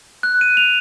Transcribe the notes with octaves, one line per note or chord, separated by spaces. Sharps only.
F#6
D#7
F7